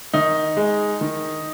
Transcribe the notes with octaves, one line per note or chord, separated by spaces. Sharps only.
D#3 D#4
G#3
D#3